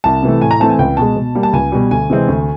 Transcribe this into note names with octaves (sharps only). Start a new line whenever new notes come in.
C2 A5
C3 E3 A3
A2 G#5
A#5
E3 A3 C4 A5
G#5
C#2 G5
B2 G#3 A5
B2
G3 A#3
A5
C#2 G#5
B2 G3
D2 G#5
C3 E3 G#3 C4
D2